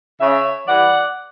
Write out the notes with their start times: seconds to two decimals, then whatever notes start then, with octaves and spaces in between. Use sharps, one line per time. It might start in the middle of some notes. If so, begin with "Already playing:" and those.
0.21 C#3 C#5 E5
0.67 E3 G3 D5 F#5